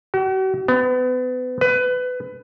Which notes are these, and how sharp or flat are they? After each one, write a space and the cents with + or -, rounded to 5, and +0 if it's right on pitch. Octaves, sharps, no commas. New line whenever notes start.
F#4 +45
B3 +35
B4 +20